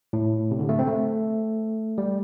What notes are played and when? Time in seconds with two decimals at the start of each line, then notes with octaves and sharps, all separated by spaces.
0.13 A2
0.51 C3
0.59 D3
0.69 A3
0.79 C4
0.87 A3
1.98 G3